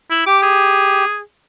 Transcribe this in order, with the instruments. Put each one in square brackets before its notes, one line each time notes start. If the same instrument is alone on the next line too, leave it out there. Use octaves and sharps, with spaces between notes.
[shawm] E4
[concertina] G4 [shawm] D6
[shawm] G#4